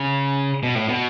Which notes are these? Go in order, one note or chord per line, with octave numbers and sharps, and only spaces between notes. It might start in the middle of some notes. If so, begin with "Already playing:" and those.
Already playing: C#3
B2
A2
B2